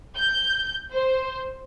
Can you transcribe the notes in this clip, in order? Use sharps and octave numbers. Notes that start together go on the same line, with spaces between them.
G6
C5